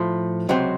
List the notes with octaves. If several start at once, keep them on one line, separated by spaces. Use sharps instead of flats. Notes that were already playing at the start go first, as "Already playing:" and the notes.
Already playing: A2 F3 A3
C#2 C3 F#3 C4